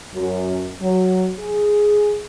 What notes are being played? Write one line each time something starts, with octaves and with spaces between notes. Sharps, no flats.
F#2
F#3
G#4